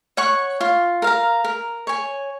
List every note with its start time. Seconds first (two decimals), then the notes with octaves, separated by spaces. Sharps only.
0.17 C#5 F#5 C#6
0.61 F4
1.02 A#4 F5 A#5
1.44 A#4
1.87 C#5 G#5